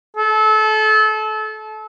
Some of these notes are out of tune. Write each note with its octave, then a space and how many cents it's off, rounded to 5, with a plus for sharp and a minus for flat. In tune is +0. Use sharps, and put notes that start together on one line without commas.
A4 -30